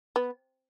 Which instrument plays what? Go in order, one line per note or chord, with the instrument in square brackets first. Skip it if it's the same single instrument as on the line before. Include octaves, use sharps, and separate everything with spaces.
[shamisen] B3